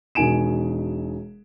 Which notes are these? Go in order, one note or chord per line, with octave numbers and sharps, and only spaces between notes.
E1 B2 D#3 G#5 D7 E7